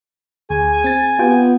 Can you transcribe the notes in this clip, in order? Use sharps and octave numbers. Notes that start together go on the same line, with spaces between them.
D2 G#4 G#5
C4 A6
B3 F4 G4 G5